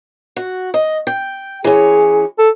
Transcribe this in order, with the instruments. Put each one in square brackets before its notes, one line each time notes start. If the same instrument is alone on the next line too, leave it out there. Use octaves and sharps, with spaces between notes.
[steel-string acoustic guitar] F#4
D#5
G5
[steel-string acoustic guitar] E3 C#4 [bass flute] G#4
[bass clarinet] A4